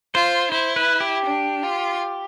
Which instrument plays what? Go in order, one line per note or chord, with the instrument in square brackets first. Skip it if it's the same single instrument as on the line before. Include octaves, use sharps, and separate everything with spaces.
[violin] F4 [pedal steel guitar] C5
[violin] E4 [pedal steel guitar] C5
[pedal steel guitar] B4
G4
[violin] D4
F4